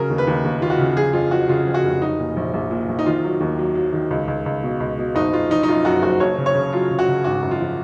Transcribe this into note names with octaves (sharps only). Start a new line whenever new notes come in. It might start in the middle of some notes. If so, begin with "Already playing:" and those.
Already playing: C#3 F#3 A#4
D#2
B4
D#2
D#2
D#2 F4
F#4
C#3
F3 G#4
F2 F4
F3 F#4
C#3 F4
F2
F#4
F1
F#3 D#4
A#2
A#1
A#1
A#2
A#1
D#4
D#3 F4
F#3
D#2
F#3
F#3
D#3
C#2
C#2
C#2
B2
C#2
B2
F#1 D#4
F#1 F4
F3 D#4
D#4
F#2 F4
F#2 F#4
F#1 F#4
F#1 C#5
C#3
C#5
C#3
F#3 F4
C#3
F#4
C#3
G#1 F#4
F#2
F4
F3